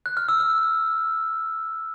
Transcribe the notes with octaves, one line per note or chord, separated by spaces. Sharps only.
F#6
F6
E6
F6